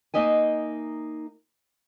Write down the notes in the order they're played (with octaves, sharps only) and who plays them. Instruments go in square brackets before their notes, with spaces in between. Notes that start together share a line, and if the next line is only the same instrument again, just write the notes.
[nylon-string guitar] A#3 D#4 D#5 E5 G#5